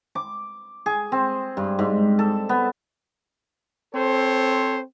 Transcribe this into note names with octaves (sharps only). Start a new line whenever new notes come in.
D6
G#4
C4
G2
G#2
A4
B3
C4 A4 C5 C#5